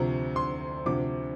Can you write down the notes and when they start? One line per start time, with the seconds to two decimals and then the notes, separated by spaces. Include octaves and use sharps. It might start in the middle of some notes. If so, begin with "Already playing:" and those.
Already playing: D2 C3 F3 A#5
0.36 C6
0.86 D2 C3 F3 D6